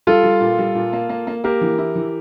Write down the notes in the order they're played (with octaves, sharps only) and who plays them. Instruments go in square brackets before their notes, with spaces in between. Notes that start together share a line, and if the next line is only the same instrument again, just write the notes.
[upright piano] G3 [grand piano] F4 A4
[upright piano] G3
A#2
G3
A#2
A#3
A#3
A#3
[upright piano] A#3 [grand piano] G4 A#4
[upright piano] E3
E4
E3